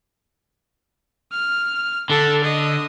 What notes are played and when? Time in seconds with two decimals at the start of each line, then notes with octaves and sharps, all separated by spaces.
1.32 F6
2.10 D3 A4
2.44 D#5